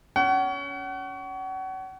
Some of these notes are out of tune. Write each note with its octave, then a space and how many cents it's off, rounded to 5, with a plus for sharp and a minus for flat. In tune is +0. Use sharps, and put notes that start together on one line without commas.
C#4 +20 F#5 +35